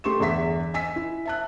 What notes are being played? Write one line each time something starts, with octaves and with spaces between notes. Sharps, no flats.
A3 G4 C6 C#6 E7
G1 E2 G#4 E5 B6
D#5 G#5 E6 B6
E4
E5 A5 F#6